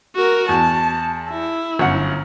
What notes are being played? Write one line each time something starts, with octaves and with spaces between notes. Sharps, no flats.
F#4 A#4
E2 A5
E4
G1 F#2 F#5